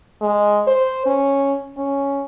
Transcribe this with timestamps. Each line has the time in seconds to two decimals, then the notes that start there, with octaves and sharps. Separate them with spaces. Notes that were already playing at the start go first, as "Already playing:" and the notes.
0.21 G#3
0.67 C5
1.06 C#4
1.77 C#4